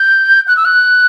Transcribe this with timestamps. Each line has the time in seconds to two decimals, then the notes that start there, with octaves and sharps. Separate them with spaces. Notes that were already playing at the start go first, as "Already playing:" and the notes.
Already playing: G6
0.48 F#6
0.57 E6
0.65 F#6